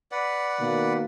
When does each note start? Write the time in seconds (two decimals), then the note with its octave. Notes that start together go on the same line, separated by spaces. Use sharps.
0.12 B4 D5 F#5
0.59 B2 D#3 A#3